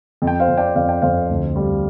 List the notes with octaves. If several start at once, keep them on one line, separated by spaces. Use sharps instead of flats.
F2
G5
C5 F5
F2
D5 G5
F2 F5
G5
F2 C5 F5
D2
G3